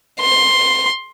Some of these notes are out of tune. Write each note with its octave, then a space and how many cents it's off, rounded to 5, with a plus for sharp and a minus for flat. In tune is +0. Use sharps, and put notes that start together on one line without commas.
C6 +10